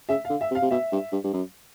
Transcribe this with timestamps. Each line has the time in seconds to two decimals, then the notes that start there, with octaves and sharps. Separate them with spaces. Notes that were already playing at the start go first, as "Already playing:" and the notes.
0.09 C#3 E5
0.25 F5
0.30 D3
0.41 E5
0.51 C3
0.55 F5
0.62 C3
0.71 B2 E5
0.92 G2
1.12 G2
1.24 G2
1.33 F#2